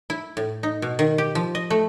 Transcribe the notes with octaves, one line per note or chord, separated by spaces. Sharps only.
E4
A2
D#4
B2
D#3
G4
F3
D#5
A3